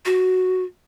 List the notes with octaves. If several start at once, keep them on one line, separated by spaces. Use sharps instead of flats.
F#4